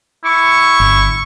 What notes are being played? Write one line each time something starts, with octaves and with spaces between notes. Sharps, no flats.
E4 C#6
G1